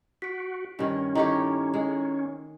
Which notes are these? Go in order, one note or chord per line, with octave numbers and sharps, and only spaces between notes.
F#4 B6 D7
G2 D#3 C#4
D#3 E4 G4 A4 C#5 A#5
G#3